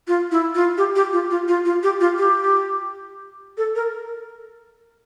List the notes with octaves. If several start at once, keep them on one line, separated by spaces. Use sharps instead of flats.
F4
E4
F4
G4
G4
F4
F4
F4
F4
G4
F4
G4
A4
A#4